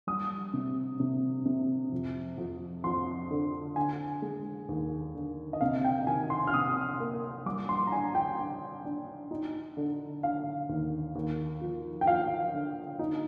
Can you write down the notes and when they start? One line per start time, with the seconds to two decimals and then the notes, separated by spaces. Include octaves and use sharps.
0.07 G3 D#6
0.54 C3
1.00 C3
1.46 C3
1.92 F2
2.38 F2
2.84 F2 C6
3.31 D3
3.76 D3 G#5
4.22 G#3
4.69 D#2
5.15 D3
5.53 D#5
5.61 C3 F5
5.84 G5
6.07 D#3 G#5
6.30 C6
6.47 F6
6.54 C3 D#6
7.00 A#3
7.46 G3 D6
7.69 C6
7.87 A#5
7.92 D4 G#5
8.15 G5
8.39 D4
8.85 D4
9.31 D#4
9.77 D3
10.23 D3 F5
10.69 D#2
11.15 D#2
11.62 F3
12.01 G5
12.07 F3 F5
12.54 D3
12.99 D#4